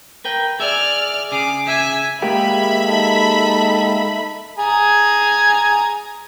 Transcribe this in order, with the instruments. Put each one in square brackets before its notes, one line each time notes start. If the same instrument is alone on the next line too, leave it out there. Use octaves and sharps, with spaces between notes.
[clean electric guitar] A#4 B4 G5
[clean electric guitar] G#4 E5 [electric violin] D5 F6
[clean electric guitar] C#3 G#4 [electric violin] D6
[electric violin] E5 G#5
[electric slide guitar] G#3 A#3 G4 [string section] E5 B5
[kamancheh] D#4 A4
[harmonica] G#4 G#5 A#5